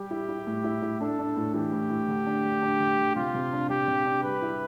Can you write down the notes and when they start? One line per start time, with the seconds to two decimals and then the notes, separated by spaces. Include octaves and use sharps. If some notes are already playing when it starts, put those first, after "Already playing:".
Already playing: G3 G4
0.11 E4
0.29 E4
0.47 A2
0.64 E4
0.82 E4
1.01 D4 A4
1.19 D4
1.36 A2
1.54 E3 G4
1.72 A2
1.90 A2
2.08 D3
2.26 D4
2.44 D3
2.62 D4
2.80 D3
2.98 D3
3.16 C3 F4
3.34 C3
3.53 D4
3.70 C3 G4
3.88 C3
4.06 D4
4.24 G3 B4
4.42 E4